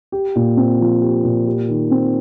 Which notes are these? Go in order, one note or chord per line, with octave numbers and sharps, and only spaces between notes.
G4
A#2
C4
F3
G4
A#2
G4
D#3
C4